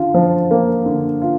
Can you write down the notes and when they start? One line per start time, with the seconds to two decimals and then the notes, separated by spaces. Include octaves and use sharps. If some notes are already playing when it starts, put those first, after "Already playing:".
Already playing: D3 F4
0.14 F3
0.51 A#3
0.86 D3
1.22 F4